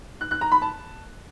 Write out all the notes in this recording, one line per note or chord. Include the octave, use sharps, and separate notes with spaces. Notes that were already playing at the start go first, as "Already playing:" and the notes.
F#6
F#6
A#5
B5
A5